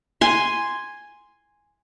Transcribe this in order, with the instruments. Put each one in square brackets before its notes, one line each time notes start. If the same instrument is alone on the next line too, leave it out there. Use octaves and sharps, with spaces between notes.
[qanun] G#5 C6